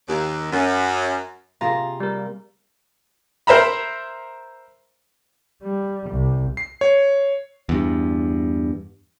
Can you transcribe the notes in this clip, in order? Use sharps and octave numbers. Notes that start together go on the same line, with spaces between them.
D#2
F#2
C3 A#3 F4 G#4 A5 A#5
G3 A#4
A#4 C5 E5 A#5 B5
G3
C2
C7
C#5
E2 G2